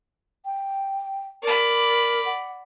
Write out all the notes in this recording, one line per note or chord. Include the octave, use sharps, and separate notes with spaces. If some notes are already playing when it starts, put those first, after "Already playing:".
G5
A#4 D5 B5
F#5